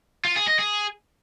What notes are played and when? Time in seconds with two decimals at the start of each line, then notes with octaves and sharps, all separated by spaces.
0.25 F4
0.36 G#4
0.47 D#5
0.59 G#4